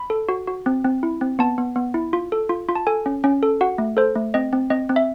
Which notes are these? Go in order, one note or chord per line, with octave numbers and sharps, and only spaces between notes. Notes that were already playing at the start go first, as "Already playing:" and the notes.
Already playing: B5
A4
F#4
F#4
C4
C4
E4
C4
B3 A5
B3
B3
E4
F4
A4
F4
F4
A5
A4 G#5
C#4
C#4
A4
F#4 F#5
A3
A4 C5
A3
C4 D#5
C4
C4 D#5
C4
E5